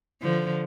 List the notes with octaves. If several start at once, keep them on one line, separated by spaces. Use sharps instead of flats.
D3 F3